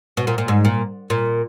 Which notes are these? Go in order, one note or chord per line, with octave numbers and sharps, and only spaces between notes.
B2
A#2
A#2
G#2
A#2
A#2